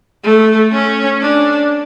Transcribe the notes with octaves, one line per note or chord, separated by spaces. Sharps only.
A3
C#4
D4